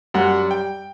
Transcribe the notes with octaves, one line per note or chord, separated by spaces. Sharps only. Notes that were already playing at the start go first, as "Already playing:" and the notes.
F#2 G3 F#5
G5